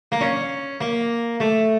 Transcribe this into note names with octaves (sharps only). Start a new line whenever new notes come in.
A#3
C#4
A#3
A3